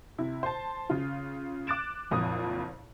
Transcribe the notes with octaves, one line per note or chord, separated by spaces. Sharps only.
C3 E4
C5 A5
C#3 F4
D6 F#6 A6 D7 E7
F#1 F2 A#2 D#6